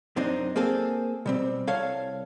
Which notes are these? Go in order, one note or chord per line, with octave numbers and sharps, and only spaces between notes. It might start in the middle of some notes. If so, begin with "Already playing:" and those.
F#2 C3 C4 D4 D#4
A#3 C4 G#4 A4
B2 G3 C4
C2 A4 C#5 F5